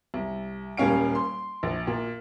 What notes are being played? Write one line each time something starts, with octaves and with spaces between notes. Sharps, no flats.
C2
D#1 G3 A#3 C#4 F5 D7
C6
A#1
A#2